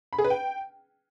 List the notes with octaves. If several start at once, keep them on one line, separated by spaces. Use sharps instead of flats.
B5
G#4
B4
G5